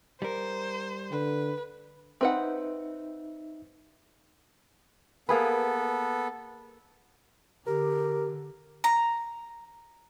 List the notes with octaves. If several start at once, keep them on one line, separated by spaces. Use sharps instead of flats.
G3 A#4 C5
D3 B4
C4 D#4 B4 E5 F#5
A#3 B3 G#4 A4 B4
D3 G4 A#4
A#5